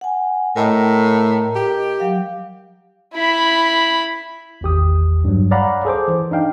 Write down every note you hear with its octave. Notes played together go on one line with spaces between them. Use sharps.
F#5 G#5
A2 A#4 D#5 A#5
G4
F#3 F5
E4 B5
G#1 E2 G4 D#6
G2 F#3
C#5 D5 F5 F#5 A#5 B5
G#4 A4 C5 D6
E3
D4 D#4 F5 G5